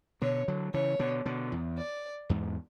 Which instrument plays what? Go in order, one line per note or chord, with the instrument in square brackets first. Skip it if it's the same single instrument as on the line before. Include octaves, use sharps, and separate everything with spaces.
[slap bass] B2 D3 [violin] C#5
[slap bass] D3 F#3
[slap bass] C#3 E3 [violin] C#5
[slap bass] B2 D3
B2 D3
E2
[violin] D5
[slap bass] E2 G#2